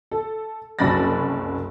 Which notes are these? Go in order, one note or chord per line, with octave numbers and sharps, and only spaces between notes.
A4
F#1 C2 F#3 B5 A6 A#6